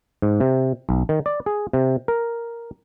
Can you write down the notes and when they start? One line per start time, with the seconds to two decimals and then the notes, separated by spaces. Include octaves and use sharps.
0.22 G#2
0.40 C3
0.89 B1
1.09 D#3
1.26 D5
1.46 G#4
1.73 C3
2.08 A#4